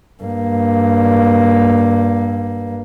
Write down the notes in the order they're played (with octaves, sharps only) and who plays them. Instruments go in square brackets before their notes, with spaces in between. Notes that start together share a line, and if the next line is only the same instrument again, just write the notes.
[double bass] G2 A#3